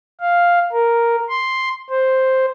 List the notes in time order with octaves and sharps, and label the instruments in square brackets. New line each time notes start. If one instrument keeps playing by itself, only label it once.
[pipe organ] F5
A#4
C6
C5